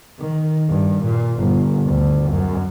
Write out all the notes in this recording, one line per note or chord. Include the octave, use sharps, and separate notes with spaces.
D#3
G2
A#2
G1
D2
F#2